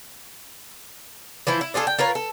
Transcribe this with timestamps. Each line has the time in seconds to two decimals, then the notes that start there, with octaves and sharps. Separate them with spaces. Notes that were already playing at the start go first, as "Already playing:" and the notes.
1.47 E3 F3 E4 C5
1.61 E4
1.74 D4 F4 G#4 A4
1.87 G5
1.98 F4 A#4 B4 C#5
2.15 A4